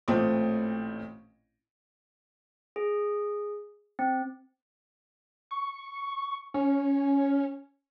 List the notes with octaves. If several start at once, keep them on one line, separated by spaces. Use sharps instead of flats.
A1 A#2 A3 C4 D6 D#6
G#4
C4
C#6
C#4